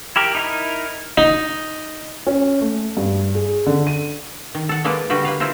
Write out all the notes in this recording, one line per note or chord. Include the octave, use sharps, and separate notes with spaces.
E4 G4 A#4
D#4 E4 A#4
D#4
C#4
A3
G2
G#4
D3
D#7
D#3
A4 F#5
G#3 A#3 A4 B4 D5
D3 G3 F#4 G4 B4
A#3 B4 F5
E4 F4 A4 A#4 C5